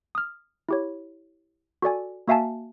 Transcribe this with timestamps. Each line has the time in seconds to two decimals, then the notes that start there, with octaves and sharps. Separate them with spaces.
0.15 D#6 F6
0.69 E4 G4 C#5
1.82 F#4 A4 D5 G#5
2.28 A#3 F#4 E5 F5 G#5 A5